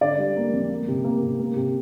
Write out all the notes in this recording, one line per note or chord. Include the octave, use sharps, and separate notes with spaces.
D3 D5
G3
A#3
F2
A#3
C3
A#3
C3
A#3
C3